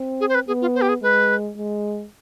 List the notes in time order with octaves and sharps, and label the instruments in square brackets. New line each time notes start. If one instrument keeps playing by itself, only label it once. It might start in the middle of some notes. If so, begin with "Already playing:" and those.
Already playing: [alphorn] C4
[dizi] G#4
C5
B4
[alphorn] B3 [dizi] G#4
[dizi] F4
C5
G4
G#4
[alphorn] G#3 [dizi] B4
[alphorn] G#3